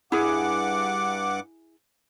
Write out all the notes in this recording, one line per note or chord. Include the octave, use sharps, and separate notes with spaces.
G2 E4 G#4 F#5 D6